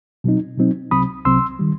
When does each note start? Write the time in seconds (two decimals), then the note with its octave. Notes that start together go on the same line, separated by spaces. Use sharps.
0.24 B2 F#3 C4 D#4
0.58 B2 F#3 C4 D#4
0.91 C2 C3 F#3 C4 B5 D#6
1.25 C2 C3 F#3 C4 C6 E6
1.59 D#3 G3